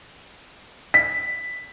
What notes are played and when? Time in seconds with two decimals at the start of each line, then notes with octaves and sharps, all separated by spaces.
0.94 B6